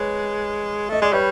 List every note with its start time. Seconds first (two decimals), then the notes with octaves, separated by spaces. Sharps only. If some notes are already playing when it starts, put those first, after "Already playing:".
Already playing: G#3 B4 C#5
0.89 A3 D#5
1.01 G#3 D5
1.13 G3 B4 C#5